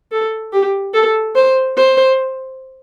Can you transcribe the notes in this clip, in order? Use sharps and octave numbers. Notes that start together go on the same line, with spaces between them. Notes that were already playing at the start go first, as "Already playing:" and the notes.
A4
G4
A4
C5
C5